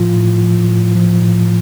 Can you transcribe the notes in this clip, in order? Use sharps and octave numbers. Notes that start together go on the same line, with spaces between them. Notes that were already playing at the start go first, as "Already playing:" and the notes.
Already playing: A2 F3 F4
A2
F3
A2
F3
A2